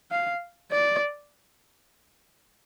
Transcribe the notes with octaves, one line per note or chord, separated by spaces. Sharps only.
F5
D5